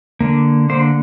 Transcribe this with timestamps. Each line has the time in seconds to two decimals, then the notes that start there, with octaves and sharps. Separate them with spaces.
0.20 D3 A#3
0.70 D3 A#3 C5